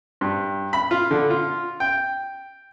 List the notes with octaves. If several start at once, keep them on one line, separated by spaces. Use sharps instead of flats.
G2
B5
F4
D3
F4
G5